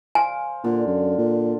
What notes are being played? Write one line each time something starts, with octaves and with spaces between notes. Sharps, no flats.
C5 F5 G#5
A#2 D3
F#2
A#2